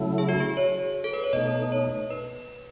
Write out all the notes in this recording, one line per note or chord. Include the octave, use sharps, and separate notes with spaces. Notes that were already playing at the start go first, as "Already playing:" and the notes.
Already playing: C#3 F#3 A3 E4
G#4
F#4
G#4
C#5
A4
B4
C#5
B2 A3 D#4 D#5
C#5
B4